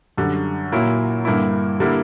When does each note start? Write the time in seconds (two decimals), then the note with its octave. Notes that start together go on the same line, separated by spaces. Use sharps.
0.18 F#2 D3 G3
0.72 A#2 F#3 A#3 E4
1.25 G2 D3 A#3 E4
1.80 D3 G3 A#3 E4